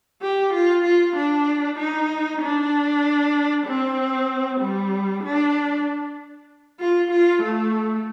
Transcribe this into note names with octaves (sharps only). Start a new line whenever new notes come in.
G4
F4
F4
D4
D#4
D4
C4
G3
D4
F4
F4
A3